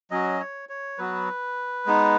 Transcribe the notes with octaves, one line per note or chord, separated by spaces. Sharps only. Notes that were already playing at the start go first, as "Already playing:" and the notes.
F#3 C#4 F#4 D#5
C#5
C#5
F#3 B3 F#4 B4
G#3 B3 D#4